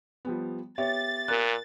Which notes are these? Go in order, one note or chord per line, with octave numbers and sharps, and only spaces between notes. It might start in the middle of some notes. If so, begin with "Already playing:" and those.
F3 G3 B3
B3 G4 C#5 E5 A6
A#2 A#4 F#6